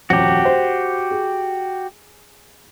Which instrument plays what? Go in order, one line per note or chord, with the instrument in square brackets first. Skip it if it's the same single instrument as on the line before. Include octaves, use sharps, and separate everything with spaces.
[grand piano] D#1 F2 [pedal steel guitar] F#4 G4
[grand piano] C5
G#4